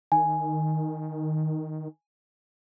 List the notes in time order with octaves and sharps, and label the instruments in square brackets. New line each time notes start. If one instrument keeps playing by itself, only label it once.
[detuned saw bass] D#3 [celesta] G#5